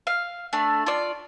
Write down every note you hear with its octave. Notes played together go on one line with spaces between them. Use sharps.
F5
A3 D4
F4 D5